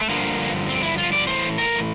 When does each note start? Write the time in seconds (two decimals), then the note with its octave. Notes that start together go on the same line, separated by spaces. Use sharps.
0.01 A3
0.09 G2 D3 F3 A#3
0.69 C4
0.83 E4
0.98 F4
1.13 D5
1.27 A2 E3 C5
1.58 A#4